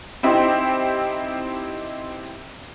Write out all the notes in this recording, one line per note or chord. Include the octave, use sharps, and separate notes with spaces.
C4 D#4 E4 G4 C5